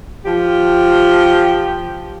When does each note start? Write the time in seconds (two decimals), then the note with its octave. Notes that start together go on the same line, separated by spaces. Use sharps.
0.24 F3 G4